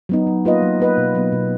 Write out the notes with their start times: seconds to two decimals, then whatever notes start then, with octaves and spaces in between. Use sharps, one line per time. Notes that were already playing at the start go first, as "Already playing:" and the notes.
0.09 F#3 B3 D#4
0.27 F#3
0.45 A#3 F4 B4 D#5
0.62 F#3
0.80 A#3 F4 B4 D#5
0.97 B2
1.15 F#3 B3
1.32 B2